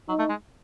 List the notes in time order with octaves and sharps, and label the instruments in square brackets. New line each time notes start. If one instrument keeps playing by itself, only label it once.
[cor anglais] F#3 [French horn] D#4
[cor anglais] A3
G#3